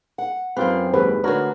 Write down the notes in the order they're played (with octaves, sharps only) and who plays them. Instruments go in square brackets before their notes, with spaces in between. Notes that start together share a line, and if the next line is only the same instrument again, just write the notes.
[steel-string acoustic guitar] F#5
[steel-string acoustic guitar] F#2 C4 [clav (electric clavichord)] F4 G4 B4
[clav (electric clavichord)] D#2 G#2 [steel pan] B4
[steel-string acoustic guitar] D2 F#4 [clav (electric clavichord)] D4 A#4 C#5 [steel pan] B4